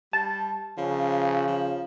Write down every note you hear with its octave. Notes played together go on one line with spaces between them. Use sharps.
G3 A5
C#3 F3
F3